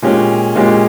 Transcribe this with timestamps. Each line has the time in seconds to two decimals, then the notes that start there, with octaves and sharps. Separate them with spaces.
0.02 A#2 G#3 C#4 G4
0.55 A#2 G#3 C#4 G4